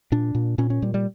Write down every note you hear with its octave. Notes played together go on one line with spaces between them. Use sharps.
A#2 D4
A#2
A#2 C#4
C#4
A#2 G3
G3